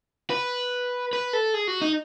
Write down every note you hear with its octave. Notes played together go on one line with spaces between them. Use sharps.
B4
B4
A4
G#4
F#4
D#4